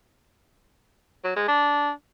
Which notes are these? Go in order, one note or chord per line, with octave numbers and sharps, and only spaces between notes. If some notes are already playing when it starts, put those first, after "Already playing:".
F#3
G#3
D4